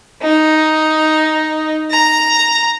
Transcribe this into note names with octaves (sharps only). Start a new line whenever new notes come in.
D#4
A#5